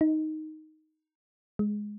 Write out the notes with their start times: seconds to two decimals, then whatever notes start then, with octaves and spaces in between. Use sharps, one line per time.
0.01 D#4
1.59 G#3